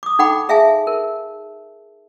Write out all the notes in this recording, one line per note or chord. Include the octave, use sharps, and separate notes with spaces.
D6 D#6
D#4 A4 F#5 G5 B5 D6
G#4 E5 F5 G#5 A5
A#4